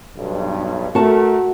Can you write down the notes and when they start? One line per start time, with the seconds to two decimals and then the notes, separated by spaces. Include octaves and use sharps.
0.17 B1 G2
0.95 A3 F#4 A#4 A5